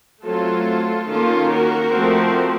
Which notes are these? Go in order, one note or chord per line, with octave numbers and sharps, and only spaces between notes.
F#3 A3 C4 F4 A4
D#3 A#3 C#4 F4 A4
F#4 A#4
F3 A3 C4